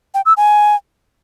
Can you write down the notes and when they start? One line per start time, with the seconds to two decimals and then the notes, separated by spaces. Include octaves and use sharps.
0.14 G5
0.26 E6
0.37 G#5